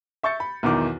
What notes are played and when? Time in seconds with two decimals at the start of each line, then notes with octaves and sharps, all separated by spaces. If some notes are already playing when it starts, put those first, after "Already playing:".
0.23 E5 C#6 G6 A6 C#7
0.40 B5
0.63 B1 E2 D#3 D6